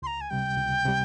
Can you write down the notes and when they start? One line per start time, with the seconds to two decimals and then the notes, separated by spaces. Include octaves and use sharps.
0.02 C#2 C6
0.07 A#5
0.21 G#5
0.30 C3 G3 G5
0.57 C#2
0.85 C3 G3